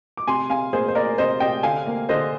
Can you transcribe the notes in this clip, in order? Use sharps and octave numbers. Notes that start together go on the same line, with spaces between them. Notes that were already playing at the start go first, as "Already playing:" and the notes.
D6
C3 G#5 C6
C3 F5 G#5
A#3 G#4 C5
C5
A#3 A#4 D5
C3 C5 D#5
C3 D#5 G5
D3 F5 G#5
A#3
D3 C5 D#5